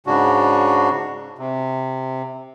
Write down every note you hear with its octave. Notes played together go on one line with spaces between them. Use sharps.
G#2 C#3 D4 F#4
C3